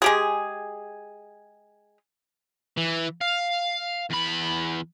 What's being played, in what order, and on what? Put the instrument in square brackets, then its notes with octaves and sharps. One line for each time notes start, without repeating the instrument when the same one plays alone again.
[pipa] G#3 G4 G#4
[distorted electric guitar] E3
F5
E2 B5